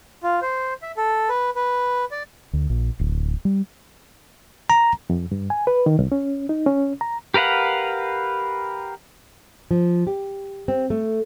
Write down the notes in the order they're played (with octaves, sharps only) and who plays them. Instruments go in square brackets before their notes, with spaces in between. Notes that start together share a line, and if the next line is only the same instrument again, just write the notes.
[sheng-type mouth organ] F4
C5
E5
A4
B4
B4
D5
[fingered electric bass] D2
A#1
D1
G3
[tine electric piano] A#5
[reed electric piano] F2
G2
G#5
B4
D#3
C2
C#4
D#4
C#4
A#5
[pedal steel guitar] G4 A#4 B4 F5 F#5
[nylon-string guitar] F3
G4
C4
A3